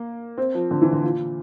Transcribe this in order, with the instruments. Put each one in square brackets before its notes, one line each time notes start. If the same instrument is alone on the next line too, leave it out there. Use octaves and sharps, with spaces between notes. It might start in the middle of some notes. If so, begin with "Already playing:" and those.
Already playing: [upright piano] A#3
C4
F3
D3
E3
D3
A#2